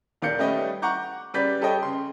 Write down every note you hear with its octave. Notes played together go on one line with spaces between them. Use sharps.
D#1 D#3 D5 F5 G6 C#7
G3 A3 C#4 B4 D#5 G5
F#5 A#5 C#6 D6 G6
C#3 G3 B4 D5 G6 B6
G4 A4 B4 C#5 D#5 G5
C#3 C6